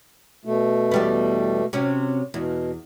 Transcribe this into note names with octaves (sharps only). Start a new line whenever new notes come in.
B2 A3
E2 G3 B3
C3 F#3 C#4
E2 B2